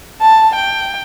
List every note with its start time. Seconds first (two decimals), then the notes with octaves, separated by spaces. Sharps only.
0.22 A5
0.56 G5